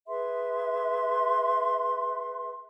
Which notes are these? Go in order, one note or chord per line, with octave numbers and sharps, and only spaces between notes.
G#4 B4 E5 C6